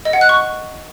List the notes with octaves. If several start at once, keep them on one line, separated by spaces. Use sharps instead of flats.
D#5
F#5
F#6
C#6